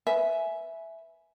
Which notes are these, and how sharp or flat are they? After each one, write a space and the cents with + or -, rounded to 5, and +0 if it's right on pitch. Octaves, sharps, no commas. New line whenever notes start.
B4 +0 E5 +0 G#5 +15